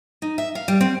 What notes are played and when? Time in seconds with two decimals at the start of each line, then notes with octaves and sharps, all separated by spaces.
0.22 D#4
0.38 E5
0.55 F5
0.68 G3
0.81 C4